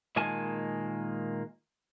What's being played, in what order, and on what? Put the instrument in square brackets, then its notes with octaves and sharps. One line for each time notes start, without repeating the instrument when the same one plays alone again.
[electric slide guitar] A#2 D#3 G#3 A#3 G#5 A5